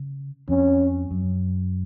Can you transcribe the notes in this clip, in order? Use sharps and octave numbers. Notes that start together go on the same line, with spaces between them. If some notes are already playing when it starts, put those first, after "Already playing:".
Already playing: C#3
F2 C#4
F#2